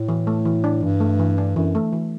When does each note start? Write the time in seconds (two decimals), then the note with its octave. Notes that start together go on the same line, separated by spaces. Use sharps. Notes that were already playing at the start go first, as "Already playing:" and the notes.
Already playing: A2
0.09 E3
0.27 A3
0.45 E3
0.64 D4
0.83 G2 E3
1.00 A3
1.19 E3
1.38 D4
1.56 F#2 E3
1.75 A3
1.93 E3